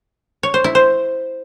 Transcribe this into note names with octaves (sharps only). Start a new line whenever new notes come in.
C#5
C5
E4
C5